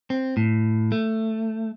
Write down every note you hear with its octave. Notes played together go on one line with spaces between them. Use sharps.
C4
A2
A3